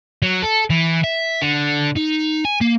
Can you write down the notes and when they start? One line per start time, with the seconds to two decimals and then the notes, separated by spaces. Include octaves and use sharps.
0.22 F#3
0.43 A4
0.70 E3
1.04 E5
1.41 D3
1.96 D#4
2.45 G#5
2.61 A#3